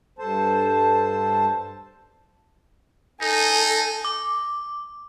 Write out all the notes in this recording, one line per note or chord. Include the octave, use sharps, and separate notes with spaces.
G2 A4 C5 A5
D#4 A4 G#5
D6